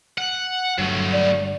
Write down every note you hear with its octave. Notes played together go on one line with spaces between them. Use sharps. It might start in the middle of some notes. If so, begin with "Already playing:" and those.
F#5
G1 G2 F#3 A3
D5